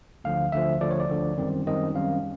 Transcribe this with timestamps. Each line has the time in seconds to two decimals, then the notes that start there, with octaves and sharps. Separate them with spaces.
0.24 D2 D3 F3 F5
0.52 D2 D3 F3 E5
0.81 D2 D3 F3 D5
0.91 C#5
1.00 D5
1.09 D2 D3 F3
1.38 F#2 D#3 G3 C4
1.67 F#2 D#3 G3 C4 D#5
1.95 F#2 D#3 G3 C4 F5